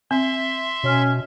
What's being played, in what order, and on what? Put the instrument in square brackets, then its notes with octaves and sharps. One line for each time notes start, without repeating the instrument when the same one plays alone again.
[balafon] C4 [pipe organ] E5 C6
[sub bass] B2 [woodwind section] C#4